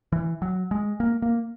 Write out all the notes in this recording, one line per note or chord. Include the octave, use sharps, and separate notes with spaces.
E3
F#3
G#3
A#3
A#3